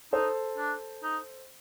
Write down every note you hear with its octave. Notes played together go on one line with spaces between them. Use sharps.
D#4 A4 C5
D4
D#4